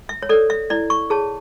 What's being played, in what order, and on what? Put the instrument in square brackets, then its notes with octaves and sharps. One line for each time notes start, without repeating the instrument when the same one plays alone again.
[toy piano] E5
C#5
A4 D5
C#5
E5
E4 D5
C#6
G#4 C#5 A5